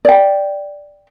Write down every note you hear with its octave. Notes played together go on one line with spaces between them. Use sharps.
D5 G5